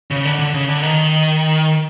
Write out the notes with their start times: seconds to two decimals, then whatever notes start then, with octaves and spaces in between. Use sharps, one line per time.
0.11 C#3
0.25 D3
0.39 D3
0.54 C#3
0.69 D3
0.83 D#3